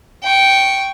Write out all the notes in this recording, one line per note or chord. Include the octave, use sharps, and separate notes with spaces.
G5 C#6